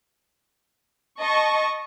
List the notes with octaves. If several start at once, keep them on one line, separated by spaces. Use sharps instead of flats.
D#5 A5 C#6